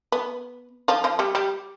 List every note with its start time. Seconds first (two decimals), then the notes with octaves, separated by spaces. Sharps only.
0.12 B3
0.88 F3 F4
1.04 F3 F4
1.19 G3 G4
1.35 G3 G4